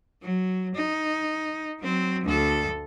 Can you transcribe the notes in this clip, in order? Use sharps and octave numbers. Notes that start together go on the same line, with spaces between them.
F#3
D#4
F#3 C4
D2 A4